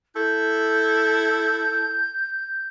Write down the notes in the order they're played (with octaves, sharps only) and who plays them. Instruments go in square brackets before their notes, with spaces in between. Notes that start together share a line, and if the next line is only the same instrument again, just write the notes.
[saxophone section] E4 A4 [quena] G6